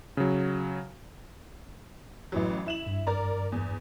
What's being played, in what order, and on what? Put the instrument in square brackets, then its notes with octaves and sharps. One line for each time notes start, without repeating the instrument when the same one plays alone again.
[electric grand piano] C#3 F#3
[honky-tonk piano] A1 E3 F#3
E4 E7 F#7
[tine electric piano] G2
[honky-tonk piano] A#4 D5 A#5
E2